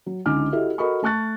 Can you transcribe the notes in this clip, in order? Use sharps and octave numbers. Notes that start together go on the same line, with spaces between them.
F#3
C#2 D3 D#4 G#5 D6 F6
E4 F#4 G4 A4 D#5 E5
F#4 A4 A#4 D#5 B5 C#6
A3 A5 C#6 F#6 A6